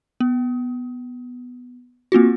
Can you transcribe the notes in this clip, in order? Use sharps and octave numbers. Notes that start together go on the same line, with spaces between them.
B3
A#3 C4 F4 F#4